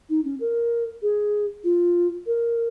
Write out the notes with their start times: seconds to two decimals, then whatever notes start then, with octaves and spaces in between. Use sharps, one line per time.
0.09 D#4
0.24 C#4
0.40 A#4
1.02 G#4
1.64 F4
2.26 A#4